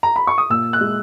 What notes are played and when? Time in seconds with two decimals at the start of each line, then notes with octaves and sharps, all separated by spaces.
0.03 A#5
0.16 B5
0.27 C#6
0.38 D#6
0.50 A#2 E6
0.73 F#6
0.81 G#3